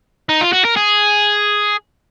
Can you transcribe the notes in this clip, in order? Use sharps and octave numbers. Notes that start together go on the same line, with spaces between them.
D#4
F4
F#4
A#4
G#4